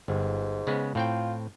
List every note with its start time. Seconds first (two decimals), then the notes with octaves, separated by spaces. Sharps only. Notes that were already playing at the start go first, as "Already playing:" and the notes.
0.08 G1 G#2
0.67 C#3 G#3 B3
0.95 A2 C4 F4 G5